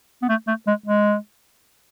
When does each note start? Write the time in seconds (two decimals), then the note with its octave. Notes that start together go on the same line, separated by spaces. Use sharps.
0.22 B3
0.29 A3
0.47 A3
0.67 G#3
0.86 G#3